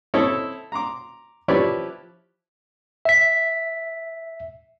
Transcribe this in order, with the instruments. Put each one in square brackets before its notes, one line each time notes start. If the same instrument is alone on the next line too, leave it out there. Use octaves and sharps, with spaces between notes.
[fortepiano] C4 E4 A4 C#5 D#5
A#5 C6 D6
F3 E4 G4 B4 C#5 D5
[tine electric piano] E5 B6